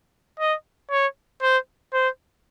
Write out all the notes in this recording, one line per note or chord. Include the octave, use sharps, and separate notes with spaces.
D#5
C#5
C5
C5